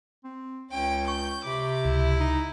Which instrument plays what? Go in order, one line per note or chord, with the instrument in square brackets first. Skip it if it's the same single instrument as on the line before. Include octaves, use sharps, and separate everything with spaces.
[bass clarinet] C4
[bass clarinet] C#2 [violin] C#4 G5
[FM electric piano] C#6 [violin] G6
[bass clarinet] C3 [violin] B5 D6
[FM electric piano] C#2 [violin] E4
[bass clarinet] D#4